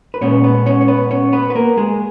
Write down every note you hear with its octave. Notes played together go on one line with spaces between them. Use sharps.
B4
A#2 G#3 B3 C#4 C#5
B3 B4
C#4 C#5
C#5
B3 B4
C#4 C#5
B3 B4
B4
A#3 A#4
G#3 G#4